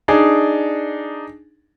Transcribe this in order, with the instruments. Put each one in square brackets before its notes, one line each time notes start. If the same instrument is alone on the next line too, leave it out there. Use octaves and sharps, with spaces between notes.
[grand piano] D4 D#4 G#4 D5